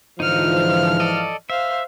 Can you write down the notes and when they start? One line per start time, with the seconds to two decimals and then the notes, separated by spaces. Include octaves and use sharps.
0.20 G#2 D3 E3 F3 D#4 F5 F6
1.00 A4 D5 D#5
1.50 C5 E5 F5